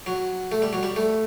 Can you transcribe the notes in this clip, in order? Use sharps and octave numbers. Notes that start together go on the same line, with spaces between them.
F#3
A3
G3
F#3
G3
A3